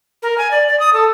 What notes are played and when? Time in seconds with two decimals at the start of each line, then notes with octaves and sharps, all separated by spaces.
0.23 A#4
0.38 G#5
0.51 D5
0.68 D5
0.80 D#6
0.93 A4